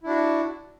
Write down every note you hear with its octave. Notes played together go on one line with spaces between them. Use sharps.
D4 E4 F#4